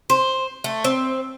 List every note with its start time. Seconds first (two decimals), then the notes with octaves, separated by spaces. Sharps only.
0.10 C5
0.64 A3
0.84 C4